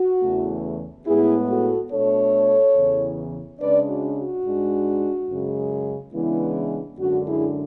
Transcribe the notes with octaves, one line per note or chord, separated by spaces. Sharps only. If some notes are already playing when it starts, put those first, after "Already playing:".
Already playing: F#4
E2 C#3 E3 A3
A2 G#3 B3 E4 G#4
F#4 A4
B2 A3 D4 A4 C#5
E2 C#3 E3
C#3 G#3 D4 B4 D5
F#4
F#4
G#2 G#3 D4
F#2 C#3 G#3
C#3 E3 G#3 B3 D4 E4
F#2 D3 G#3 D4 F#4
E4 G#4